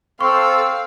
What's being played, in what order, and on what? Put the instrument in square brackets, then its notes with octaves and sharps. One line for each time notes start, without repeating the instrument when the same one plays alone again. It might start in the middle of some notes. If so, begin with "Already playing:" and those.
[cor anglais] C4 [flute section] A4 C5 E6 [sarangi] F5 [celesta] C#6